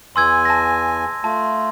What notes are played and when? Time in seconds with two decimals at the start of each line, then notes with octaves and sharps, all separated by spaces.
0.16 E2 E3 G#5 C6 E6 G#6
0.45 A5 A#6
1.24 A3 F4 A5